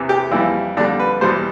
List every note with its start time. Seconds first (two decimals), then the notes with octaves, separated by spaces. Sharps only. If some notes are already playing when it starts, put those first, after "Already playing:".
Already playing: E2 C3 E3
0.09 G4
0.31 F2 E3 G3 E4
0.77 F2 D3 G3 D4
1.00 B4
1.21 E2 B2 G3 C5